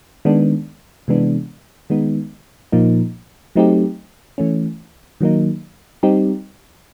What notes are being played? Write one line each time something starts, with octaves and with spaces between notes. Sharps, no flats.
D#3 G#3 B3 D4
C3 E3 G#3 B3 D4
D#3 G#3 B3 D#4
A#2 F3 A#3 D#4
F#3 A3 C4 D#4 G4
E3 A3 C#4
D#3 F#3 A#3 D#4
G3 C4 D#4 G4